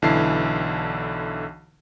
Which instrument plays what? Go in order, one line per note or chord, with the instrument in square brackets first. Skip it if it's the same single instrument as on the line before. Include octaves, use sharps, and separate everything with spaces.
[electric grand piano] B1 D3 E3 E4 A5 C7